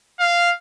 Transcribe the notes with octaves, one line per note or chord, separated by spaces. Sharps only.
F5